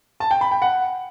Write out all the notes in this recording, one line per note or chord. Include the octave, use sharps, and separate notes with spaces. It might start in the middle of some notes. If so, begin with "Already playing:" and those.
A5
G5
B5
G5
F#5